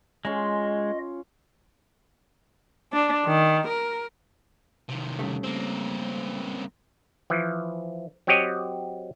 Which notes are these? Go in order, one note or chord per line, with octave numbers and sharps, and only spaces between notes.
G#3 C#4 F4 D#5 C6
D4
D#3
A#4
C3 D#3
C#3 G3 A3
A#3 C4
E3 F3
F#3 C4 F#4 G4 C#5 D#5